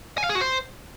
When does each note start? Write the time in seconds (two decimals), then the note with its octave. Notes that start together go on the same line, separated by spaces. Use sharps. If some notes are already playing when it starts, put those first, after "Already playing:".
0.18 G#5
0.24 F5
0.29 G#4
0.35 F#4
0.41 C5